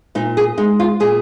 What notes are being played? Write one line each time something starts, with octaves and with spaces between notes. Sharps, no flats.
A#2 D#4
G#4
G#3 D#4
F4
A#2 G#4